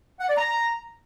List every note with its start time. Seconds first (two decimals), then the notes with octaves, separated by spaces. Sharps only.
0.20 F#5
0.29 D5
0.37 A#5